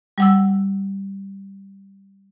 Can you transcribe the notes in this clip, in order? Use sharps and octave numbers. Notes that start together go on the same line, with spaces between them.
G3 F#5 E6